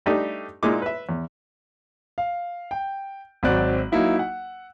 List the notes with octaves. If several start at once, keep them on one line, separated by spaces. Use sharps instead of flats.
G3 A3 D4 D#4 G4
A#2 G#3 A#3 D#4 E4 D6
B4 E5
E2
F5
G5
G#1 F#3 C4 D5 F#6
F#3 A#3 D#4 E4 F#4
F#5